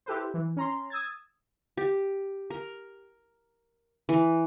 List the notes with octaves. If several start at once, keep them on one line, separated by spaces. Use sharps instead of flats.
E4 G4 A4 B4 C5
E3
C#4 A#5 C6
D#6 E6 G#6 A6
G4
A#4
E3